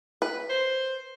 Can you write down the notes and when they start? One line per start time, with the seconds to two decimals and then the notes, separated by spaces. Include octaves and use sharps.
0.22 B4
0.50 C5